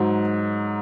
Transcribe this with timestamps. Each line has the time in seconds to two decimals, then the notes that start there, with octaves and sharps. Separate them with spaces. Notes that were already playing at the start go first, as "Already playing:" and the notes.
Already playing: G#2 F#3